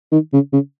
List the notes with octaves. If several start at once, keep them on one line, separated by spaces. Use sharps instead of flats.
D#3
C#3
C#3